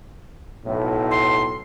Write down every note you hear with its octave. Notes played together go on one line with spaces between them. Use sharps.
B1 A2
C6